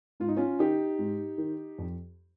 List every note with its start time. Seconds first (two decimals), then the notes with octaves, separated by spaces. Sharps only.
0.20 G#2 F4
0.28 D#4
0.37 C#4 F4
0.59 D#3 D#4 G4
0.99 G#2
1.38 D#3
1.78 F2